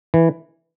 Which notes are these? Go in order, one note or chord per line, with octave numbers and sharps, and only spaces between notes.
E3